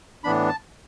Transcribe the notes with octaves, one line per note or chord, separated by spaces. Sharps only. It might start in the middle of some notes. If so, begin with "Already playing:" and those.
A2 E3 B3 D4 B5
A5